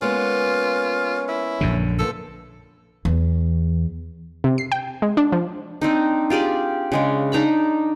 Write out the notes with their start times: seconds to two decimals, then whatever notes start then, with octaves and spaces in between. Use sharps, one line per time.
0.02 G#3 A#3 B3 C#4 F4
1.28 E4
1.61 A#1 F#2 D3
1.99 F3 A#3 B3 A4
3.05 E2
4.44 C3
4.58 C7
4.72 G5
5.02 G#3
5.17 D4
5.32 F3
5.81 C4 D4 D#4
6.30 F4 G4 G#4 D5
6.92 C#3 G#3 D4
7.32 D4 D#4 A#5 B5